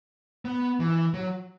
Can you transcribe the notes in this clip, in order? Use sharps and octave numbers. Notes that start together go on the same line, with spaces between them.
B3
E3
F#3